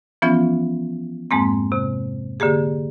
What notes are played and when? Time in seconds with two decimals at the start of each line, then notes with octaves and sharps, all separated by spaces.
0.22 E3 F3 B3 C#4 F4
1.31 F2 G#2 G#3 A#3 C4
1.72 C3
2.40 D3 A#3 G4 G#4